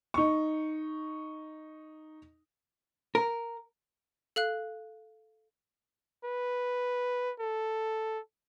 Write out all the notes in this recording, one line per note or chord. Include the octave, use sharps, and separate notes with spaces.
D#4 C#6
A#4
A4 F5 F#6
B4
A4